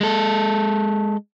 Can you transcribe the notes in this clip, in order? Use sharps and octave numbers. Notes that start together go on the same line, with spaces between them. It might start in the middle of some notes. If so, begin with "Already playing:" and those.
G#3 A4